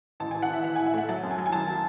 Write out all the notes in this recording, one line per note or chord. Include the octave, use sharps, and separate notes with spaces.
A1 A5
G#5
E3
F#5
E3 E5
E3 F#5
G#5
A2
E5
A3 F#5
F#3 A5
F#2
G#5
F#3
G#5
F#3 A5
F#3